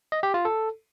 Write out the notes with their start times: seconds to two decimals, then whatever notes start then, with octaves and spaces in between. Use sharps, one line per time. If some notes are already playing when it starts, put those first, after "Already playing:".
0.12 D#5
0.23 G4
0.34 F4
0.45 A4